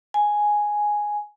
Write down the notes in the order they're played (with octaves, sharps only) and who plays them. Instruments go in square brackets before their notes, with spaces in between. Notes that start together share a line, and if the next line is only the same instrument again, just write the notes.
[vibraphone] G#5